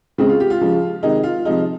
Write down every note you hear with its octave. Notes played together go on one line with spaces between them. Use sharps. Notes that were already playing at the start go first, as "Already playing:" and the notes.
C#3 G#3 C4
F4
G4
F4
C#3 F3 G#3
C3 D#3 G#3 D#4
F4
C3 F3 G#3 D#4